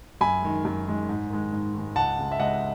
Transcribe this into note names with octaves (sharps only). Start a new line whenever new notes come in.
F#2 G#5 B5
D#3 G#3
F#2
D#3 G#3
G#2
D#3 G#3
G#2
D#3 G#3
C#2 F#5 A5
C#3 G#3
E5
C#2 D#5 F#5